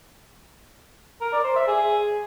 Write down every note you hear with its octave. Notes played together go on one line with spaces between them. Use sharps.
A#4
D5
C5
E5
G#4